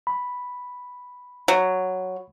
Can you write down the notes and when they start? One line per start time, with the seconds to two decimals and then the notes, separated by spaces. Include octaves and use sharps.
0.07 B5
1.48 F#3